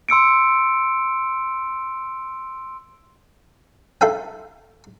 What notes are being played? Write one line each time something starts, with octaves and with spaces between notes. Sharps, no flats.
C6 E6 C#7 D7
E4 A4 E5 F5 G5